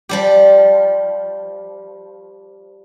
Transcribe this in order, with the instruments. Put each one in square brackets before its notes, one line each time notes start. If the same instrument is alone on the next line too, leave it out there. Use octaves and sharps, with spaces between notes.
[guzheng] F3 G3 G4